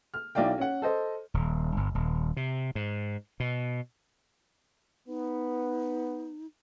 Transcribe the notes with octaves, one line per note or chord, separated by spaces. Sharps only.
F6
B1 E4 D5 F5 G5
C#4 F#5
A4 C5 D#5
D#1
G1
D#1
C3
G#2
B2
B3 D#4